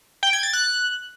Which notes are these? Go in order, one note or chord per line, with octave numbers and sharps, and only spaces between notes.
G5
G#6
A6
F#6